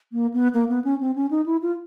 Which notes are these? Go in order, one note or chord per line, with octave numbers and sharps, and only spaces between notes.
A#3
B3
A#3
B3
C#4
C4
C#4
D#4
E4
F4